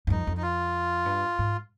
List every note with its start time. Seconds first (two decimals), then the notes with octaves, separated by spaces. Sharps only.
0.07 G2
0.10 F2 D#4
0.27 F2
0.37 D#4
0.42 F4
1.06 G2
1.39 G#2